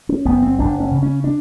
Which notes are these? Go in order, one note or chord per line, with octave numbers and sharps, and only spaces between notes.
C#4
F#1 B3
C4
F#1 D4
C#4
C#3
C#4
D4